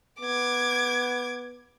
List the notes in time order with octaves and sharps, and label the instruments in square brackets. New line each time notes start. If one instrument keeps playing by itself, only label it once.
[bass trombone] B3 [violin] D6 G#6